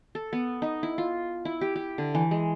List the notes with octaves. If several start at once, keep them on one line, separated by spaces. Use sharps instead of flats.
A4
B3
D#4
E4
F4
E4
G4
G4
D3
E3
G#3